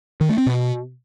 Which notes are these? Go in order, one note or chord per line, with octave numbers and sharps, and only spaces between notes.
D#3
A3
C4
B2